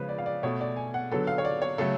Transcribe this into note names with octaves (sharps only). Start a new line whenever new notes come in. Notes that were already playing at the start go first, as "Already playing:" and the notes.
Already playing: C#3 F3 G#3 B4
D5
F5
D5
B2 A3 C#5
D5
G#5
F#5
D3 F#3 B3 A4
F5
C#5
D5
C#5
C#3 F#3 A3 A4